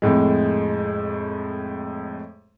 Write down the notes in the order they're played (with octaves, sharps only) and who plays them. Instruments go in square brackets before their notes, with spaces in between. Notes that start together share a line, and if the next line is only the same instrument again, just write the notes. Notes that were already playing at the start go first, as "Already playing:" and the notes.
[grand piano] F2 A2 G#3